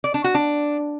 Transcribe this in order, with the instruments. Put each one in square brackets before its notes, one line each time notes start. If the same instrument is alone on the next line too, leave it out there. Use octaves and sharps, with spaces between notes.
[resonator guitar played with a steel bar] D5
D4
F#4
D4